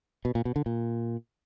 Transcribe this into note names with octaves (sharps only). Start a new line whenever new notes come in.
B2
A#2
B2
D3
A#2